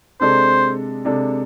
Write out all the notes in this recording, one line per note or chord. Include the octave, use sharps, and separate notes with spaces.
C3 G#3 D4 A4 C5
C3 G#3 D4 A4